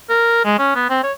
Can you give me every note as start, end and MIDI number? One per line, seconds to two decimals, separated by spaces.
0.10 0.41 70
0.45 0.58 56
0.59 0.73 61
0.76 0.85 59
0.89 1.00 60
1.04 1.12 73